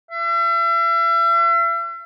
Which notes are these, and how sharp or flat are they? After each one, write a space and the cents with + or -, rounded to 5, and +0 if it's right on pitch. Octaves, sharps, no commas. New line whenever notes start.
E5 +40